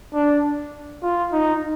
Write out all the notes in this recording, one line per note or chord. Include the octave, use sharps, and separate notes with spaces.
D4
F4
D#4